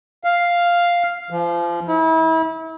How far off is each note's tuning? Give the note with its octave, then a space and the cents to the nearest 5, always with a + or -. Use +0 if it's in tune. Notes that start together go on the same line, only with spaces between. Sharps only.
F5 +0
F3 -30
E4 -35